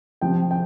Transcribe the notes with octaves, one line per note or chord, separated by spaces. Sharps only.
C3 F3 C4 G5
G5